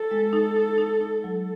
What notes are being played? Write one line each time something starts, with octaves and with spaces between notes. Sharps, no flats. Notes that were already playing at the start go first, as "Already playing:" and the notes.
Already playing: A4
G#3
D#4
D#4
D#4
D#4
F#3